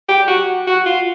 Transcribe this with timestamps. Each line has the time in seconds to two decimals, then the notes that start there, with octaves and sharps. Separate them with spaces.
0.09 G4
0.28 F#4
0.67 F#4
0.86 F4